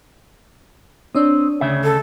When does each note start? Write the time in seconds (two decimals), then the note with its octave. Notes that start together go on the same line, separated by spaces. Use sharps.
1.15 C4 D4 C#5 D#6
1.61 D2 C#3 E5
1.84 A4